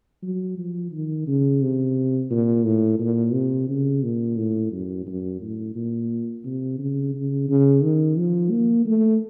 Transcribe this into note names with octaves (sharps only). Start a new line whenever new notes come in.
F#3
F3
D#3
C#3
C3
A#2
A2
A#2
C3
C#3
A#2
A2
F#2
F#2
A2
A#2
C3
C#3
C#3
C#3
D#3
F3
A#3
A3